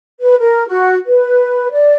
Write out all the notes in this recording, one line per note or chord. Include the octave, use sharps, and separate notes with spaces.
B4
A#4
F#4
B4
D5